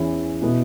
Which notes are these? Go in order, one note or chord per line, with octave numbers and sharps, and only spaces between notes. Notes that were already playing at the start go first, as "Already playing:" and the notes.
Already playing: E2 E3 C#4 E4
B2 B3 E4